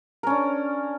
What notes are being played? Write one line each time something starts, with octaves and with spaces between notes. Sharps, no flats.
C#4 D4 A#4